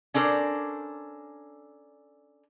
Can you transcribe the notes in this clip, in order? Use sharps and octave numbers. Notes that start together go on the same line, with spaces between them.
C#4 D4 A4 A#4 C5